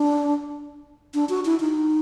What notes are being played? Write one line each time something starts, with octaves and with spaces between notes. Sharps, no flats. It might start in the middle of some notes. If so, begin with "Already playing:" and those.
Already playing: D4
D4
F#4
E4
D#4